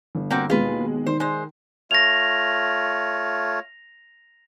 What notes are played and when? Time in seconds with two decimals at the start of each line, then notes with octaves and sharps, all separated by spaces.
0.15 G1
0.30 A#3 C4 F#4
0.50 D#2 B2 G#3 F4 B4
1.06 D#3 C5
1.20 G#3 C5
1.91 A3 F4 C#5 A#6 F7